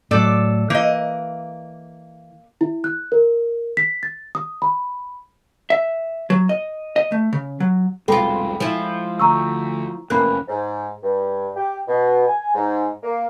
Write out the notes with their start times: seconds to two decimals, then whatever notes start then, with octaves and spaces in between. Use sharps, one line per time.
0.11 A2 F#3 A4 D5
0.70 E3 A#3 D#5
2.61 E4
2.84 F#6
3.12 A#4
3.77 B6
4.03 A6
4.35 D#6
4.62 B5
5.70 E5
6.30 F#3
6.49 D#5
6.96 D#5
7.12 A3
7.33 C#3
7.60 F#3
8.08 F1 C2 B2 G#3 F4 A4 G5 B5
8.60 F3 G#3 E4
9.19 D2 A#5 C#6 E6
10.10 F1 E2 A#3 C#4 B5 F#6
10.48 G#2
11.02 G2
11.56 G4
11.88 B2
12.27 G#5
12.54 G#2
13.03 A#3